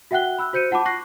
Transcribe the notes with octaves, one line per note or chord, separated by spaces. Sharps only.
F#4 E5 F#5 G5 F#6 G7
B5 E6 F#6
F#4 C5 G6 C#7 D#7
F4 F#5 A5 B5 D6
C#6 F#6 A#6 C7